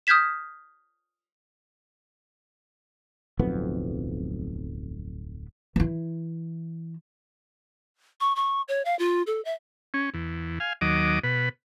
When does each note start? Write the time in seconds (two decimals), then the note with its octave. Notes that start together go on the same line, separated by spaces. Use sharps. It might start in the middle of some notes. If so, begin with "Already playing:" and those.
0.07 D#6 F6 G6 G#6 B6 E7
3.39 D1 B1 F2 B3
5.76 E3 E4
8.21 C#6
8.36 C#6
8.68 C#5
8.85 F5
8.99 F4
9.27 A4
9.45 E5
9.94 C#4
10.14 E2
10.60 F5 G#5
10.81 D#2 F#3 D#5 D6
11.24 B2 B4